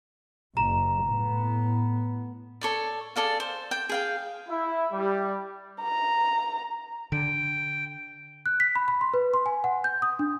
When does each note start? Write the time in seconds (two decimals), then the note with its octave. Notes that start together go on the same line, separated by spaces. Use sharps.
0.57 F#1 A#5 E7
1.05 A2 B3
2.61 A4 C#5 D5
3.16 G#4 A4 D5 F5
3.40 C5
3.71 G5
3.89 G#4 F5 G5
4.49 E4
4.93 G3
5.82 A#5
7.12 D3 G5
8.46 F#6
8.60 B6
8.76 B5
8.88 B5
9.01 C6
9.14 B4
9.34 C6
9.46 G#5
9.64 F#5
9.84 G6
10.02 D#6
10.19 D4